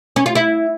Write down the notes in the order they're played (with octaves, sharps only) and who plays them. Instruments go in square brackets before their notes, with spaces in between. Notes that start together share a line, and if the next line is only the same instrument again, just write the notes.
[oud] C#4
F4
E4